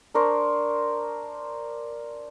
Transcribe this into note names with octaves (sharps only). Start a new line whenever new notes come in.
D4 A#4 C5 C#6